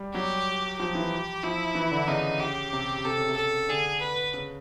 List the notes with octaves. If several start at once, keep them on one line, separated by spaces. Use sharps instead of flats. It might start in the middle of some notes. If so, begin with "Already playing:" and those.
Already playing: G3
F#3 G4
F3 G4
E3
F3 E4
E3
D3
C#3 D#4
G4
C3
C3 A4
C#3
C3
A4
D3 G#4
B4
C#3